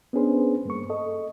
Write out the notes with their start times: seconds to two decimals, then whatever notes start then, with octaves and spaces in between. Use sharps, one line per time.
0.13 B3 C#4 D4 G#4 B4 C5
0.65 G2 A#3 C#6
0.90 A4 D#5